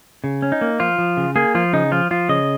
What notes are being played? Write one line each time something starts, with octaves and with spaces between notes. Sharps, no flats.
C#3
C#4
D#4
A#3
F3 F4
F3
C#3
A#3 G#4
F3 F4
C#3 D#4
F3 F4
F3 F4
C#3 D#5